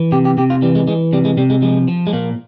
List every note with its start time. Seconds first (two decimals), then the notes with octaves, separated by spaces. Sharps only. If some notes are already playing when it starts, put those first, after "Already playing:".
Already playing: E3
0.12 C3 G4
0.25 G4
0.38 C3 G4
0.50 F4
0.62 E3 G3
0.75 G#3
0.87 E3 G#3
1.13 C3 G3
1.25 G#3
1.37 C3 G3
1.50 G#3
1.62 F3 G#3
1.88 F3
2.07 G#3
2.13 A#2 A#3